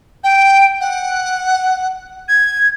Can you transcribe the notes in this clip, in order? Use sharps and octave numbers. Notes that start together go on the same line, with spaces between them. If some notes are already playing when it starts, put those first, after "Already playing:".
G5
F#5
G#6